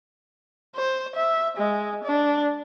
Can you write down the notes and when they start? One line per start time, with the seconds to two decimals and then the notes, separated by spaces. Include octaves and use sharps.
0.76 C5
1.16 E5
1.57 G#3
2.04 D4